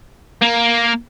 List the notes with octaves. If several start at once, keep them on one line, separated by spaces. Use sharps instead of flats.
A#3